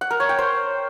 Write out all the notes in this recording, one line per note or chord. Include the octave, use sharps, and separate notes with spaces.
F#5
A#4
C#5
G5
C5